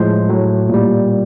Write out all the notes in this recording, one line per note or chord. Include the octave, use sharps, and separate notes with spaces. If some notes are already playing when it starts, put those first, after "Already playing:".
Already playing: A2 F3 G#3 C5
A2 F#3
A#2 G3